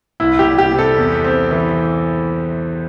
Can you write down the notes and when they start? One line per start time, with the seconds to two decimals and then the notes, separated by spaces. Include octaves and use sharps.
0.20 C2 E4
0.39 G4
0.46 G3
0.58 G4
0.72 C3
0.79 A4
0.98 E2
1.24 C4
1.51 E3